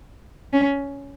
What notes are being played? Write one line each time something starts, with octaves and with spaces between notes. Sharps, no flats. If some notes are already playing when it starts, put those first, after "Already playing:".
C#4